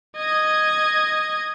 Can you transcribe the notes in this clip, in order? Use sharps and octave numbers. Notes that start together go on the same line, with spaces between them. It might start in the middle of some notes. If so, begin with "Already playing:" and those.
D#5 G#6